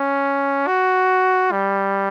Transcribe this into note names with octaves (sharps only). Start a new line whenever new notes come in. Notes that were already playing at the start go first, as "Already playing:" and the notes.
Already playing: C#4
F#4
G3